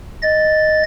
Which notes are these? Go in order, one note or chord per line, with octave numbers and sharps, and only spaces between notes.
D#5 A6